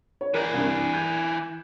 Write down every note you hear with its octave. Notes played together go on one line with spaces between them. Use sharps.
C#5
E3 A#4 D5 D#7
C2 G2
G6 G#6